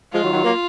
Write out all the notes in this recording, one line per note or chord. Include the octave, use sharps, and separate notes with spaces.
F3 G#3 F4
D#3 F#3
D#3 F#3
F#3 A#3